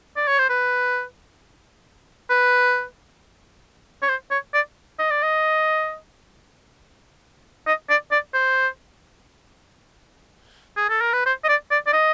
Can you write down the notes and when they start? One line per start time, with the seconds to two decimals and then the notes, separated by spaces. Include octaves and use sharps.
0.16 D5
0.27 C#5
0.39 C5
0.49 B4
2.30 B4
4.02 C#5
4.08 C5
4.31 C#5
4.54 D5
4.99 D#5
5.10 D5
5.22 D#5
7.67 D#5
7.89 D5
8.11 D5
8.34 C5
10.76 G#4
10.89 A4
11.01 A#4
11.13 B4
11.26 C5
11.44 D#5
11.48 D5
11.71 D5
11.86 D5
11.93 D#5